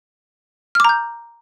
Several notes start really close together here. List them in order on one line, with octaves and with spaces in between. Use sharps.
F6 D6 A#5 G6